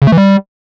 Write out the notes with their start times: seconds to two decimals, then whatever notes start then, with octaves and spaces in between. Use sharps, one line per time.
0.02 C#3
0.07 A3
0.12 E3
0.18 G3